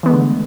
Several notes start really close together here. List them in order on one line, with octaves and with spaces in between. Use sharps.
E3 B3 G#3 A3 D3